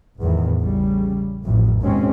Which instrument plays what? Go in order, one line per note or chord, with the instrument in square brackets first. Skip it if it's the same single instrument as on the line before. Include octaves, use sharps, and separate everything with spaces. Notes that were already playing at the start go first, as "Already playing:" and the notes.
[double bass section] G1 E2 A2 D#3
A1 C#3 G3
A1 F2 A2
D#2 G#2 B2 G#3 C4 C#4